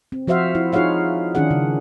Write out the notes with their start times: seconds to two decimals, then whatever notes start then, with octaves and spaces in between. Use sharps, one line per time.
0.12 C4
0.27 F3 F#4 C5 E5 F5
0.55 E4
0.72 D#4 F4 G#4 C#5 F5 F#5
1.35 D#3 C#4 D4 G#4 F#5
1.51 C#3